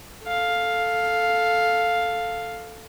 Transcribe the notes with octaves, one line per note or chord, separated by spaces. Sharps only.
A4 F5